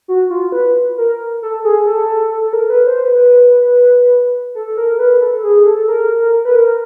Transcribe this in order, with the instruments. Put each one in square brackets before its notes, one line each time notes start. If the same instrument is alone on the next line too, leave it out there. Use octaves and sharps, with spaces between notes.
[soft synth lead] F#4
F4
B4
A#4
A4
G#4
A4
A4
A#4
B4
C5
B4
A4
A#4
B4
A4
G#4
A4
A#4
B4
A#4